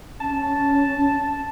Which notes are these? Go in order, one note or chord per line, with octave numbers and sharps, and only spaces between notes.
C#4 A5